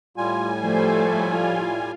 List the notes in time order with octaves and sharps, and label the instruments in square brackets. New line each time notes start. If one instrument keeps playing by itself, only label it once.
[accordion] A2 G3 G#5 [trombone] F4
[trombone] F3 [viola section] A3 A4 [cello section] C5
[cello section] F4